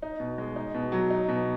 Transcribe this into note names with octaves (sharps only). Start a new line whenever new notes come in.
D#4
B2
G#3
D#4
B2
F#3
D#4
B2